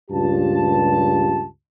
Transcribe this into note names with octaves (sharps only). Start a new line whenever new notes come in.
C#2 G2 A#2 F4 G4 A5